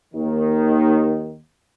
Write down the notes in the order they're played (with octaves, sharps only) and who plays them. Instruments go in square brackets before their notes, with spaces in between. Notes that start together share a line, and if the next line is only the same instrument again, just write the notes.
[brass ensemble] D#2 D#3